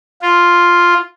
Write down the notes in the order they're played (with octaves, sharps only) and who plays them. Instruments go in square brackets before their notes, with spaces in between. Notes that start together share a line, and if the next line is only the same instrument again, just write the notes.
[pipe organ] F4